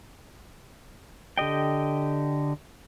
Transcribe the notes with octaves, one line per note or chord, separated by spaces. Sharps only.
D3 G4 D#5 G5